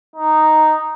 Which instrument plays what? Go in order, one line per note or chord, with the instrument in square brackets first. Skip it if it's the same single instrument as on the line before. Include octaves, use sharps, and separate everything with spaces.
[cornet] D#4